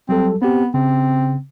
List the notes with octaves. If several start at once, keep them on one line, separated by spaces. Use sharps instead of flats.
F#3 G3 C4 A4
B3 C4 G4
C#3 C4